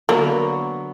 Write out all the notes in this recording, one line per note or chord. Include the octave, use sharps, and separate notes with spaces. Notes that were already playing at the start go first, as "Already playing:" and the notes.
D3 F#3 A#3 B3